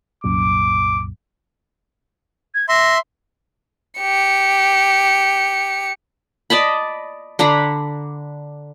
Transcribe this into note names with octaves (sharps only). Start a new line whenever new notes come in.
C2 F#2 A#2 D6
G#6
E5 C6 A#6
G4 C#7
D5 D#5 A5 B5
D3 D4 A#5 B5